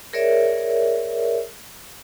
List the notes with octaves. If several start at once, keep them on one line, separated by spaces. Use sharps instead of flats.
G#4 A#4 C#5 D5 E5